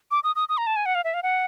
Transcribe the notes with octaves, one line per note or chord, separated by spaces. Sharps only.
D6
D#6
D#6
D#6
A#5
A5
G#5
F#5
F5
E5
F5
F#5